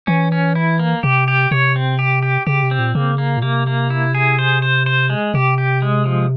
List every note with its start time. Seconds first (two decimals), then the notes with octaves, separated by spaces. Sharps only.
0.07 E3 C#4
0.32 C#4
0.55 E4
0.79 A#3
1.03 C3 G4
1.28 G4
1.51 C3 C#5
1.76 C4
1.99 G4
2.23 G4
2.47 C#3 G4
2.63 C3
2.71 C4
2.79 A#2
2.95 C#3 A#3
3.18 A#3
3.37 A#2
3.42 C3 A#3
3.67 A#3
3.90 E4
4.15 G#4
4.39 C5
4.62 C5
4.86 C5
5.10 G#3
5.34 C3 G4
5.58 G4
5.82 G#3
6.06 F3